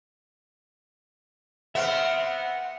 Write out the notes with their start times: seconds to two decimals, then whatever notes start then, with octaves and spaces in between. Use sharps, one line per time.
1.75 B3 C4 E5 F#5 F6